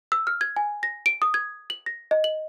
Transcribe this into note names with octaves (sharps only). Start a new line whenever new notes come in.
E6
F6
G#6
G#5
A#6
D7
D#6
G#6
F#7
A#6
D#5
F#7